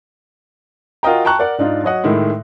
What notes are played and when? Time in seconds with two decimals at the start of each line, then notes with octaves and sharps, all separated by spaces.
1.03 F4 F#4 A#4 D#5 G5 A#5
1.25 G5 A5 A#5 C#6 F#6
1.38 A#4 D5 F#5
1.58 G#2 D4 D#4 F4
1.83 F#3 C#5 D#5 F#5
2.04 A2 D#3 G#3 E4